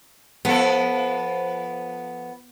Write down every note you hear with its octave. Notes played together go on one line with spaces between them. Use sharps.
F3 B3 A4